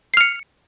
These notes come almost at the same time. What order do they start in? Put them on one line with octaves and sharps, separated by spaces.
C7 F6 C#7